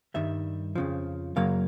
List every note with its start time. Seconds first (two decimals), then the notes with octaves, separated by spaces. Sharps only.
0.14 G2 D#3 G3 E5
0.75 F2 C#3 F3
1.36 F#2 C#3 F#3 A#3 F5